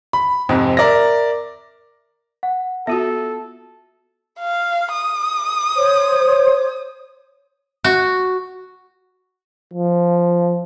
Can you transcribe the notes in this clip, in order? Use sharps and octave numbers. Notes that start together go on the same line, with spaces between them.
B5
F2 G#2 C3 C4
A#4 D5 E5 A#6
F#5
B3 F4 F#4 A4 E5
F5
D#6
C5 C#5
F#4
F3